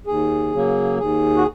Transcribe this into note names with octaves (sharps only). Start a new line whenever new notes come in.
D#2 G#4
C#3 F#3 A#3
D#2 G#4
F#4